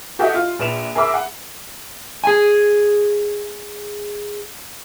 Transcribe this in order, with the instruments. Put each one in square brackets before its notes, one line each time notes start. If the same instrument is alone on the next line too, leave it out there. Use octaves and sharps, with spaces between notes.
[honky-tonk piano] F#4 G4 A4 D#5 E5
F4
A#1 B4 E7 F7
G#4 A#4 E5 B5 D6 E6
F#5
[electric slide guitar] G#4 G#5